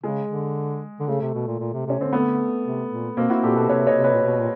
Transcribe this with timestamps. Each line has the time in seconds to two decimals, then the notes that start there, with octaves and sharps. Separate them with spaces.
0.04 C#3 G#3
0.29 D3
1.00 D3
1.08 C#3 A3
1.21 C3
1.34 B2
1.47 A#2
1.60 A#2
1.73 C3
1.87 C3 C#4
1.99 D3 C4
2.13 A3 B3
2.65 C3
2.90 A#2
3.17 B2 A#3 C4
3.30 E4 F#4
3.43 A#2 G4 A4
3.56 B2 A4 B4
3.69 C3 B4 C#5
3.87 C#5 D#5
3.95 C3
4.04 B4 C#5
4.14 A#2
4.22 B2
4.40 A#2